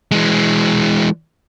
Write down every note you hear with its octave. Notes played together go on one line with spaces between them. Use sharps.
E3 G#3